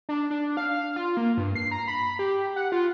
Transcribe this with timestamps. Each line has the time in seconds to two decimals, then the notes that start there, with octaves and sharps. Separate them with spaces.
0.09 D4
0.31 D4
0.57 F5
0.96 F4
1.17 A#3
1.37 G2
1.55 C7
1.71 A#5
1.88 B5
2.19 G4
2.56 F#5
2.72 F4